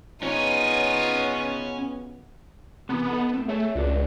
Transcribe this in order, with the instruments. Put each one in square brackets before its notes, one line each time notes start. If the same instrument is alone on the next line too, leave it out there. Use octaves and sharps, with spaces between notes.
[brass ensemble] C#3 F#3 B3 [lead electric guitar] C#4 C#5 [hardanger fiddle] D#4 F4
[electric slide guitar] C3 E3 [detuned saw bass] B3
[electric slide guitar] D#4 A4
A2 C4
[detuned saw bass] A3 [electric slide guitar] G#4 C#5 E5
[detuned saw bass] C#2 [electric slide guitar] D4 F#4 D5